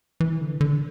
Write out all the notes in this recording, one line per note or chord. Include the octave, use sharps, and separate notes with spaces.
E3
D3
D3